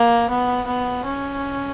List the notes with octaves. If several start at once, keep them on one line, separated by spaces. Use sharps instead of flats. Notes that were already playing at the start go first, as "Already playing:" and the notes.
Already playing: A#3
B3
B3
C#4